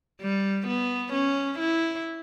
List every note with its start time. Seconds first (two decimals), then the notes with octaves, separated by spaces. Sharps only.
0.22 G3
0.67 B3
1.13 C#4
1.59 E4